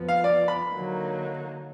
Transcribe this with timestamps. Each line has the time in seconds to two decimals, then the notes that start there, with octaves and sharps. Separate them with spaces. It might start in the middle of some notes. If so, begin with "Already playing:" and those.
Already playing: F2 F3 B3
0.09 F5
0.24 D5
0.48 B5
0.72 D3 F#3 A#3 D#4